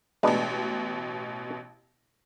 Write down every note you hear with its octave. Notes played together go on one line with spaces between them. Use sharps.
A1 B2 G#3 D4 B4